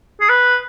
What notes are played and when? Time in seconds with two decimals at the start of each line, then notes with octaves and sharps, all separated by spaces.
0.21 G#4
0.29 B4